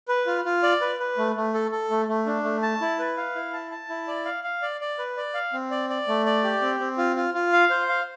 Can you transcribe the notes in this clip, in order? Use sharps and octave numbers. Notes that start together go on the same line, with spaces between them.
B4
F4
F4
D5
B4
B4
A3
A3
A4
A4
A3
A3
D4
A3
A5
E4
B4
F5
E4
A5
A5
E4
D5
F5
F5
D5
D5
B4
D5
F5
C4
D5
D5
A3
D5
G4
C4
C4
F4
F4
F4
F5
C5
F5